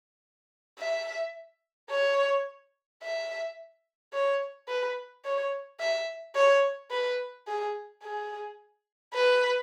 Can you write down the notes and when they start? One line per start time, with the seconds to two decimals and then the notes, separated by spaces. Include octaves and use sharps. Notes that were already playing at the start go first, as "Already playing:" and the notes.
0.79 E5
1.90 C#5
3.02 E5
4.14 C#5
4.68 B4
5.25 C#5
5.80 E5
6.35 C#5
6.91 B4
7.47 G#4
8.03 G#4
9.14 B4